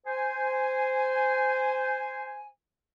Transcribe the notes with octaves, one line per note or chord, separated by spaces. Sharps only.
C5 G#5